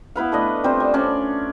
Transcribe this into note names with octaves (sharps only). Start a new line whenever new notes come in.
B3 E4 B4 F5
A3 D4 D#5
G3 C4 F4 C5
G3
C#4 D4 D5